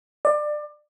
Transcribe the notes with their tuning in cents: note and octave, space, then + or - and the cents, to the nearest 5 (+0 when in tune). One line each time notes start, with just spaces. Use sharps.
D5 +25